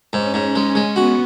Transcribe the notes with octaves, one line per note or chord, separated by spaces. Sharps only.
G#2 C#4
G#2
G#3 C#4
G#3
B3 F#4